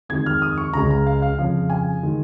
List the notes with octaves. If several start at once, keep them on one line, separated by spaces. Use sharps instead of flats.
F2 D#3 G#3 G#6
F6
D#6
C#6
C#2 C#3 G#3 A#5
A#5
F5
F5
F2 C#3 F3 F5
G#5
D#3 G#3